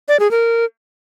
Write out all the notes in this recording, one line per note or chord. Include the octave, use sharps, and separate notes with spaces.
D5
G#4
A#4